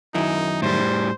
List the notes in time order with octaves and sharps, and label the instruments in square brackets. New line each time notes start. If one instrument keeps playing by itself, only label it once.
[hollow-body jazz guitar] F#2 D#3 E4 [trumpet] D#4
[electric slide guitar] A2 G3 [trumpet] C5